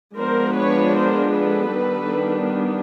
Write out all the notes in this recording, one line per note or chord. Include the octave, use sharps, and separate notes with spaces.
F3 G#3 B3 D4 A#4 C5
B4 C#5
A#4 C5
A4 B4
D#3 G3 B3 D4